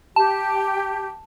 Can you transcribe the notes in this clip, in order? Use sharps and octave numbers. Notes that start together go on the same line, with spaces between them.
G4 A5